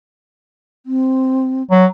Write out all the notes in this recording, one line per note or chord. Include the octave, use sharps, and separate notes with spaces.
C4
F#3